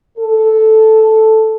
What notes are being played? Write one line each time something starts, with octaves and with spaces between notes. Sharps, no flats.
A4